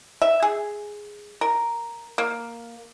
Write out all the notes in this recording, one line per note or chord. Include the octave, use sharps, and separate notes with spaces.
E5
G#4
A#4
A#3